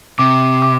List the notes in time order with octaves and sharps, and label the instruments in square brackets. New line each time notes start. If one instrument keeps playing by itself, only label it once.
[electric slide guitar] C3 [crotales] D6
[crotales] D6